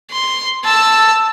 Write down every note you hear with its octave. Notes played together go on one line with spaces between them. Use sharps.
C6
A5 E6